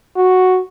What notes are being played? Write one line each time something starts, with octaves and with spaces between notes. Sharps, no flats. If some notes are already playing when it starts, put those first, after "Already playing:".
F#4